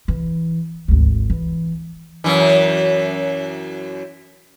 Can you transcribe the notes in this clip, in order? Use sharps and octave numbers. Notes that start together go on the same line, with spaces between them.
E3
G#1 D2
E3
F#2 E3